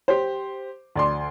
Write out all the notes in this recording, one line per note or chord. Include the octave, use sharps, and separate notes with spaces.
G4 C5
D2 D5 C6